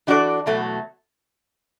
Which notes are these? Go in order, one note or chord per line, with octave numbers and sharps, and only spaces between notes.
E3 D4 F#4 A4 D5
E2 B2 F#3 A3